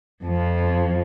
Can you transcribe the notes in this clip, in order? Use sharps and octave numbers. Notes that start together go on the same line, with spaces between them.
F2 F3